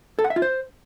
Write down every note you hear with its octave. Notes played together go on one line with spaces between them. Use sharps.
A4
F#5
E5
F4
C5